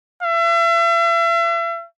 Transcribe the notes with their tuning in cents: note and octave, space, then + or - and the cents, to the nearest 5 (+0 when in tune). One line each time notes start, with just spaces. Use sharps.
E5 +40